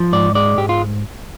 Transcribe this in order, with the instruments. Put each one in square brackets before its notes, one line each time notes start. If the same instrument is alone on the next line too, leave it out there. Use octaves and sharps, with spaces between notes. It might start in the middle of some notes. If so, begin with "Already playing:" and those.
Already playing: [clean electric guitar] F3
G#2 D5
G#3 D5
G#2 G4
F4